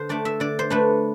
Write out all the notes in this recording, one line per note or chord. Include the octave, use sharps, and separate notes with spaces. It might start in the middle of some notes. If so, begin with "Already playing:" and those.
Already playing: D3 C5
A3 D4 D5
E5
D3 D5
C5
A3 D4 B4